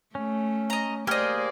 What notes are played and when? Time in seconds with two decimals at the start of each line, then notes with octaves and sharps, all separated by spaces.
0.15 A3 C#4
0.70 D#5 A#5
1.07 A#3 G4 G#4 C5 D5 D#5 F6